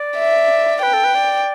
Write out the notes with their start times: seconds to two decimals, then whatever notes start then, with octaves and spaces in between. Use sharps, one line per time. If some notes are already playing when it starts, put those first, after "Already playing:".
Already playing: D5
0.19 E5
0.82 B4 G5
0.93 A4
1.04 B4
1.15 D5